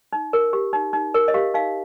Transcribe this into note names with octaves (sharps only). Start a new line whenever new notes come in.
D#4
A#4
G4
D#4
D#4
A#4
D#5
G4 F5
D#4 F5